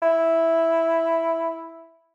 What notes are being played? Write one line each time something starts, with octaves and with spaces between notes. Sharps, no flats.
E4